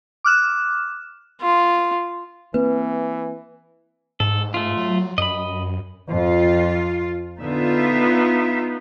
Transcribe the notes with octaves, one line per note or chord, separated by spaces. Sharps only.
D6 F6 F#6 E7
F4
E3 A#3 C4 B4
G#2 A4
A3 F4
F#3
F#2 D#5 B5
F2 F4
D3 B3 D#4 F4 E5